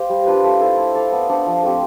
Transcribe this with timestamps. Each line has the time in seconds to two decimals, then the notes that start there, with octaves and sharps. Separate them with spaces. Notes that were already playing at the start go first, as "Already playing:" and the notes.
Already playing: G4 C5 F5
0.10 G3
0.27 D4 F4 B4
0.44 A3
0.60 E4 A4 C5
0.78 E4
0.95 A4 D5 F5
1.12 B3
1.29 D4 A4 C5
1.47 F3
1.63 A3 C4 G4